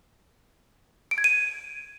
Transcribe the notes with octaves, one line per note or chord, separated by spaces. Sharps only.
D7
G#6
D#7